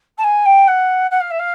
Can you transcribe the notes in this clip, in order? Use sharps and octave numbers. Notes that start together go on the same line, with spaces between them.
A5
G#5
G5
F#5
F#5
F5
E5
F5